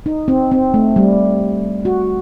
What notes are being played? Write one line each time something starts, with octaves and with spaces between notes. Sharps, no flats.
D#4
C4
C4
A3
G3
F#4